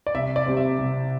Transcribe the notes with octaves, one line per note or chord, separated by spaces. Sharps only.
D5
C2 E5
D5
C3 G3 C4
E5
C2